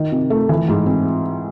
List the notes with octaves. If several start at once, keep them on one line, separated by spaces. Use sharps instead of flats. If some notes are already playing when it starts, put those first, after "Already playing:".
Already playing: D#3
C3
A3
E3
G#2
C4